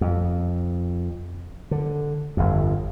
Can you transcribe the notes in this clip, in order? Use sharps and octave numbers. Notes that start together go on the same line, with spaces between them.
F2
D3
G1 F2